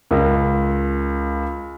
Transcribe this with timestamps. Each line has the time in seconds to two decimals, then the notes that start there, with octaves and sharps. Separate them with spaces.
0.11 C#2 A#4